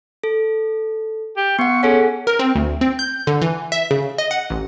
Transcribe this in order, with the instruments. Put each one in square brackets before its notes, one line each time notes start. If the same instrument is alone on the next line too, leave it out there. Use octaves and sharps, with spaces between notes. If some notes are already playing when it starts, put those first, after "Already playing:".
[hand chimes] A4
[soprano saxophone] G4
[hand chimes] B3 F#5 [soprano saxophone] C#6
[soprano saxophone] C#4 [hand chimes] G#4 A4 F#5
[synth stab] A#4
C4
D2
C4
G6
D3
E3
E5
C#3
D#5
F#5
A1